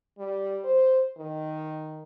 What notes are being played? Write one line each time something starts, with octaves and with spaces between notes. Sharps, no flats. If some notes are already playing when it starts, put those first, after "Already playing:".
G3
C5
D#3